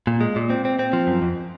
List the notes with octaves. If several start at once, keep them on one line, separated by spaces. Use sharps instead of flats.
A#2
G#3
A#2
C4
C4
C4
F3
F#2
F2